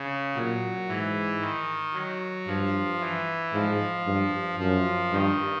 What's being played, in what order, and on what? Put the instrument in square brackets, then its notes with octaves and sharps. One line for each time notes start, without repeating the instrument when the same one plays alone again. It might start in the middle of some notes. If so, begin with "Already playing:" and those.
Already playing: [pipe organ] C#3
[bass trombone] A#2 [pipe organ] F#3
[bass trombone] G#2 [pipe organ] E3
[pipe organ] D#3
F#3
[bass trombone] G2 [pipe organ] F3
[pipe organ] E3
[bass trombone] G#2 [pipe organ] F3
[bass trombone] G2
[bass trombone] F#2 [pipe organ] F3
[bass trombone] G2 [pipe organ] D#3